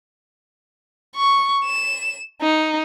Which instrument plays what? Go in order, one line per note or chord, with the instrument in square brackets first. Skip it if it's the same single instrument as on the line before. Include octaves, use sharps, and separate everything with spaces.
[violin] C#6
E7
D#4